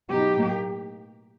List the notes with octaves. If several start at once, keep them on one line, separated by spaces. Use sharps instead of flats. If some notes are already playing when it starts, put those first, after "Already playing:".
B2 F#3 B3 D#4 G4
A2 F#3 A#3 D#4